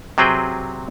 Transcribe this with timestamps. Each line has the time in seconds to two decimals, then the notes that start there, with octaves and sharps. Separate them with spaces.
0.18 C3 F#3 C4 G#4 B4 G5